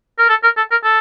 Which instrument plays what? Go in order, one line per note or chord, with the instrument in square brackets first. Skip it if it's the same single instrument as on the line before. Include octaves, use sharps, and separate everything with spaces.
[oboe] A#4
A4
A#4
A4
A#4
A4